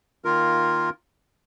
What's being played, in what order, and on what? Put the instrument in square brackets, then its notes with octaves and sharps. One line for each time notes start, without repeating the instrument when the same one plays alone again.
[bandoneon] D#3 A#3 F4 A#4